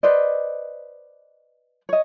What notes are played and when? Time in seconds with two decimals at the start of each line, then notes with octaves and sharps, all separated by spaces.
0.03 B4 C5 D5 D#5
1.89 C#5 D#5